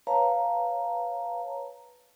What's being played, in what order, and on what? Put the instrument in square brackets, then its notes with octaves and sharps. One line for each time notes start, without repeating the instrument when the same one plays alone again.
[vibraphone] B4 C#5 F5 A5 A#5